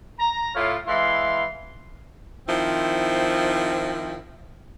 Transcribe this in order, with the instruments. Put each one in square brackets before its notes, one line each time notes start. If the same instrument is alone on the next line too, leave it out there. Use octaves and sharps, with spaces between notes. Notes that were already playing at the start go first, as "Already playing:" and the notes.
[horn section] A#5
A2 F4 C#5 F5
E3 G#3 E4 F5 C6
[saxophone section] D#3 F3 C4 E4